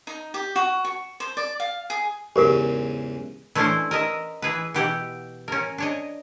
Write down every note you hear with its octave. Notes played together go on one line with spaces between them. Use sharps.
D#4
G4
F#4
C#6
C5
D5
F5
G#4
E2 G#2 C#3 G4 A#4
E3 A3 C#4 D4 E4 C5
A#4 D#5 E5
E3 G#4 B4
B2 E3 G4 F#5
C#4 A#4
D4 C#5 D#5